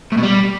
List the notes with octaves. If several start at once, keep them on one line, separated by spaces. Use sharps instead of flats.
A2
B2
G3